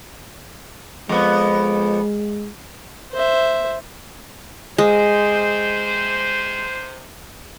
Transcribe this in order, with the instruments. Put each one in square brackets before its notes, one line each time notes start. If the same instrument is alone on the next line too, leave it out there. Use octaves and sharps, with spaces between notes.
[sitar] F2 B3 [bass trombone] G#3
[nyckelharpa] C5 E5
[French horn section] C3 C5 [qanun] G#3